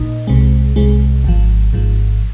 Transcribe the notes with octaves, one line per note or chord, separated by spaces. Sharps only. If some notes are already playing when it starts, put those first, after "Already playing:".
Already playing: A#1 A#2 D#4
C2 C3 G#3
C2 C3 G#3
G#1 G#2 F3
G#1 G#2 F3